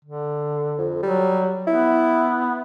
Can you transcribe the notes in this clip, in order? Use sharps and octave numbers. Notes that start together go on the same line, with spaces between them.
D3
F2
F#3 G3
B3 E4